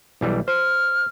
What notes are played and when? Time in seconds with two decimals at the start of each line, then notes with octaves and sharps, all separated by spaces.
0.21 B1 E3 G3
0.48 C5 F6